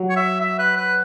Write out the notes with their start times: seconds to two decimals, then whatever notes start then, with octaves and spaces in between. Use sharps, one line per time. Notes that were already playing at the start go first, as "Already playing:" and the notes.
Already playing: F#3
0.09 C#5
0.16 E5
0.41 E5
0.59 B4
0.77 B4